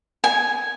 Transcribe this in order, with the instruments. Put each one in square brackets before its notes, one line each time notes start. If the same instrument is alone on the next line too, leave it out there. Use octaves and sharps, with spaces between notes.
[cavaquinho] G#5